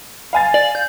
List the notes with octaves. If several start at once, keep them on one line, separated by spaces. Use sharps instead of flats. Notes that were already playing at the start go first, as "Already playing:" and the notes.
F5 G#5 A6
D5
G6